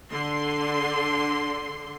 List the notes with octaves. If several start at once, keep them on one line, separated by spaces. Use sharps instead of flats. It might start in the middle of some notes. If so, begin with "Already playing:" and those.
D3 C6